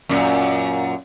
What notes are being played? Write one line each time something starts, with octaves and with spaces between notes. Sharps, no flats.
F#2 A#2